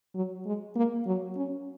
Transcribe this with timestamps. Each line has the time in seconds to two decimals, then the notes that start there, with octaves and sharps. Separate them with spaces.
0.15 F#3
0.45 G#3
0.75 A#3
1.06 F#3
1.36 C#4